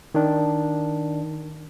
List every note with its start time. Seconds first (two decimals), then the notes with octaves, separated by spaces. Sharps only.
0.15 D#3 D4